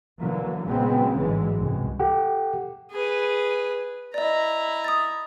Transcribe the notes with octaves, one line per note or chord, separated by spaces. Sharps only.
D3 E3 F#3 A#3
A#2 C#3 F#3 G#3 B3 C4
A1 G#2 D3 E3 F#3 G#3
C2 F#2 B2 G#3
G4 A4 F#5 G5
G#4 B4
E4 D5 D#5 A#5
D#6 A6